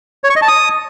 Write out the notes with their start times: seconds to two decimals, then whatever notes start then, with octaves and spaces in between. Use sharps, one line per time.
0.24 C#5
0.30 C#6
0.36 D#5
0.42 A5
0.48 D#6